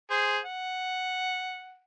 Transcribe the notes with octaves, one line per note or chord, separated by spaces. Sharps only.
G#4 C5
F#5